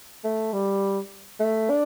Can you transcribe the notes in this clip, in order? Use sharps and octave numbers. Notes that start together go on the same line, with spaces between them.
A3
G3
A3
D4